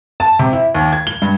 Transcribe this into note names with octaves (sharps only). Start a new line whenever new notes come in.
A5
C3
E4
D#2
G#6
G7
G2